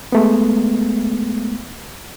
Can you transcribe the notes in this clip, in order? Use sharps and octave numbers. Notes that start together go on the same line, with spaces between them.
G#3 A3 B3